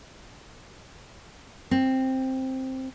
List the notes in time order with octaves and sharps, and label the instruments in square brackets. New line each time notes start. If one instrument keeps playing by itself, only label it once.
[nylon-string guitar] C4